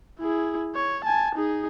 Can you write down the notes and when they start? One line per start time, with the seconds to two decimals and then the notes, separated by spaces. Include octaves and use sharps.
0.20 E4 G#4
0.75 C#5
1.05 G#5 A5
1.35 D#4 G#4